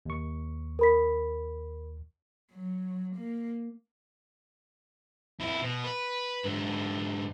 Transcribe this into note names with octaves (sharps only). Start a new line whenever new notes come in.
D#2 C#6
A#4 B5 B6
F#3
A#3
F2 E4
B2
B4
G#2 D3